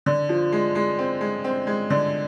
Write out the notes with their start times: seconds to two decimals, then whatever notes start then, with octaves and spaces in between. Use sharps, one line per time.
0.06 D3
0.29 F3
0.52 G#3
0.75 G#3
0.98 C4
1.21 G#3
1.44 C4
1.67 G#3
1.90 D3